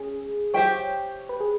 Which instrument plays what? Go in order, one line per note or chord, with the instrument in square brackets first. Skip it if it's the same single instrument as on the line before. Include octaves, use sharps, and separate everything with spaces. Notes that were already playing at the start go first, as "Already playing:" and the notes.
Already playing: [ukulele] C#4 [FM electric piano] G#4
[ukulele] G4 C5 E5 G5 [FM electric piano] C#5
[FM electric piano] B4
G#4